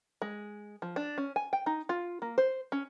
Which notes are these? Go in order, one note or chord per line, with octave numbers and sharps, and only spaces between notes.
G#3
F3
D4
C#4
G#5
G5
D#4
F4
A#3
C5
C#4